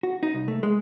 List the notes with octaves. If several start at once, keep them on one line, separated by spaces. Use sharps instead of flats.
F#4
D#4
C2
A3
G#3